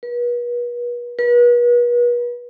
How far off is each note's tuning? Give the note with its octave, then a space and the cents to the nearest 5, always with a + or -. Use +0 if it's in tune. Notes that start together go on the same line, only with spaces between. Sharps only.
B4 -40
B4 -40